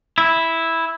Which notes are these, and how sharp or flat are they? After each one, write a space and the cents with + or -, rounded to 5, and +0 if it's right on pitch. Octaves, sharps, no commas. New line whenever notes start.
E4 -5